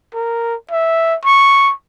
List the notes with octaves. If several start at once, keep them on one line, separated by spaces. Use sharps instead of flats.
A#4
E5
C#6